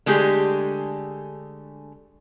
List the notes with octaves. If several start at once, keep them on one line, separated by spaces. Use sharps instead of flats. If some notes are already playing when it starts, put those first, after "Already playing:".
D3 G#3 A3 G4 G#4